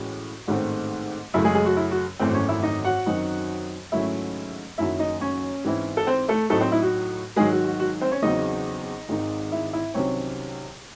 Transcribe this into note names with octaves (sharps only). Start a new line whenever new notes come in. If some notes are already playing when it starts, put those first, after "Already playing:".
Already playing: A2 E3 G#3 C#4 F#4
A1 G#2 D#3 A3 C4
F#2 C#3 F#3 A3 E4
G#3 G#4
G#3 G#4
F#4
E4
F#4
G#1 F#2 E3 A3 C4 C5
C5
C#4 C#5
E4 E5
D#4 D#5
F#4 F#5
F#2 D#3 F#3 C4 D#4
G#2 D#3 F#3 A3 C#4 E4 E5
F#1 F#2 D#3 F#3 E4 E5
D#4 D#5
C#4 C#5
G#2 E3 C4 E4
A4
C4 C5
A3 A4
A2 F#3 A3 C4 D#4 A4
C4 C5
E4
F#4
G#2 D#3 F#3 G#3 G#4
F#4
F#4
F#4
C4 C5
C#4 C#5
E2 C#3 F#3 C4 D#4 D#5
G#1 G#2 D#3 G#3 D#4
E4 E5
E4 E5
C2 C3 D#3 F#3 C4 C#4 C#5